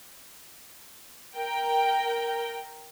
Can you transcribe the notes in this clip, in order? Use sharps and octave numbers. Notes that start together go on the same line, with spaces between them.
A#4 G5